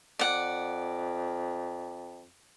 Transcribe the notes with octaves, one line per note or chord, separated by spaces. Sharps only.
F2 D5 F#5